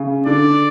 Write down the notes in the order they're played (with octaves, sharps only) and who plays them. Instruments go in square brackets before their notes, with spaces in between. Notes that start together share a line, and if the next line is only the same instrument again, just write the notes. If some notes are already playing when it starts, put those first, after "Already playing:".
Already playing: [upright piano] C#3
[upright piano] D3 [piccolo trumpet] D5